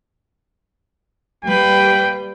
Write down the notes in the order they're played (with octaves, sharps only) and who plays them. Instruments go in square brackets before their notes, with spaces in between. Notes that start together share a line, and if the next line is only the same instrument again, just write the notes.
[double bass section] G3 [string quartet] A#3 B4 [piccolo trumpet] G5